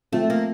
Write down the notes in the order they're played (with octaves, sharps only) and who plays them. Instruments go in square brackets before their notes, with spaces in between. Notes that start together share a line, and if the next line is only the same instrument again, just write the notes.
[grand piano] F3 C4 F4 A4 [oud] A3
[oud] A#3